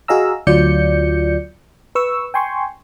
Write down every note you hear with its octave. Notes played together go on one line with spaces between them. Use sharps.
F#4 G#4 D#5 F5 A#5 E6
D2 F#3 F4 D5 G6 C#7
B4 C#6 E6
G5 G#5 C6 C#6